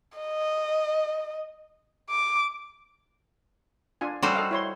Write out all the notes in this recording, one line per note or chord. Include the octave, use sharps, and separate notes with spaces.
D#5
D6
D4 F4 G#5
G3 C#4 F#4 A4 C5
A4 D#5 F5
E4 C#5 C6